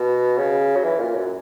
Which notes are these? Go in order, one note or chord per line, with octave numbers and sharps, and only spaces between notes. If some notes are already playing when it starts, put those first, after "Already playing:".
Already playing: B2
C#3
F#3
E3
A#2
F#2